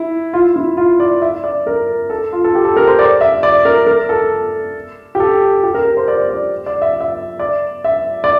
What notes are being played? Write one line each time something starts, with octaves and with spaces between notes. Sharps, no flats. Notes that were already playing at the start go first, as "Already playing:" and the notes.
Already playing: E4
F4
E4
F4
D5
E5
D5
A#4
A4
F4
A4
G4
A4
A#4
C5
D5
E5
D5
A#4
A#4
A4
G4
A4
G4
A#4
A#4
C5
D5
D5
D5
E5
E5
D5
E5
D5